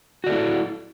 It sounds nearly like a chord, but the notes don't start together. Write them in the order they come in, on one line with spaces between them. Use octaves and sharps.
F#4 D5 A4 E4